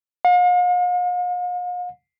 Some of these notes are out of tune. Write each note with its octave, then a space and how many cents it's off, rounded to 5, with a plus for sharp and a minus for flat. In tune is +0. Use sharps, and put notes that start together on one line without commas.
F5 +45